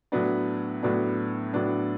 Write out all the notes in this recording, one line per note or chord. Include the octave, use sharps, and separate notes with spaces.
A2 F#3 B3 D4
A2 F#3 B3 D4
A2 F#3 B3 D4